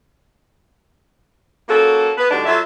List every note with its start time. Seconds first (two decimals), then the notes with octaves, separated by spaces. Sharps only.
1.69 A#3 C#4 F4 F#4 A4
2.18 B3 B4
2.31 A2 D3 G3 D4 D#4 F#4
2.46 F#3 F4 A4 E5